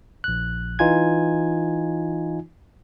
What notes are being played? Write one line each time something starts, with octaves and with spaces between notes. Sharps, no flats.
A#1 F#6
E3 D#4 F4 G#5 G#6